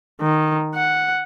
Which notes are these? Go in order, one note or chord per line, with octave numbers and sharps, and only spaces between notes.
D#3
F#5